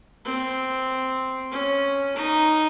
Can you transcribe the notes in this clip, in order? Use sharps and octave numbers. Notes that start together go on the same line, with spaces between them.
C4
C#4
D#4